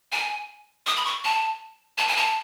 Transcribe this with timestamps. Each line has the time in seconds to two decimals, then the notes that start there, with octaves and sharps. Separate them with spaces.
0.12 G#5
0.86 D#6
0.97 B5
1.05 C#6
1.24 A5
1.98 A5
2.08 G#5
2.17 A5